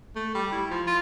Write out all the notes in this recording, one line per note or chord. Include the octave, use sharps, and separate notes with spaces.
A3
G3
E4
F3
F4